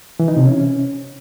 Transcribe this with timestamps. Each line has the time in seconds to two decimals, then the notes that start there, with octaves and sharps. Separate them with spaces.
0.20 E3
0.28 D#4
0.37 C3
0.45 C#4